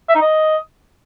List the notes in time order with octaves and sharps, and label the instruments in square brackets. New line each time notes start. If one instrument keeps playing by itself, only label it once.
[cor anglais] E5
D#4
D#5